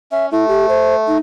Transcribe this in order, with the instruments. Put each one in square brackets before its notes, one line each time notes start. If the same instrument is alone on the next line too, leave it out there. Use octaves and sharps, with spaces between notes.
[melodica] C#4 [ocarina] E5
[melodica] A3 [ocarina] E4
[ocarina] G4
C5
D#4